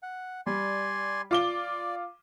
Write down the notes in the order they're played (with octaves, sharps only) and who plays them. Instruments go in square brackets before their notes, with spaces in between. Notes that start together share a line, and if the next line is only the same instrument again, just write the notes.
[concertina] F#5
[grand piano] G3 [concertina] D5 G#5 C6
[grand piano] F4 D6 G7 [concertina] D5